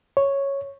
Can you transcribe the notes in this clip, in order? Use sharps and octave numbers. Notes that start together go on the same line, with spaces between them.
C#5